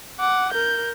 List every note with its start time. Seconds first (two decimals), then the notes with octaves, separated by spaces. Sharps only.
0.19 F#5 D6
0.52 A#4 G6